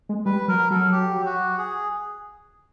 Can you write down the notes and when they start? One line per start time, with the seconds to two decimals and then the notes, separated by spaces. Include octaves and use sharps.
0.09 G#3
0.26 G3 B4
0.48 F#3 A#4
0.71 F#3 A4
0.92 G4
1.26 F#4
1.58 G#4